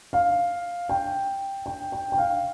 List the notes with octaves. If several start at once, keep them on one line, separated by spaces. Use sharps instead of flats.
F5
G5
G5
G5
G5
F5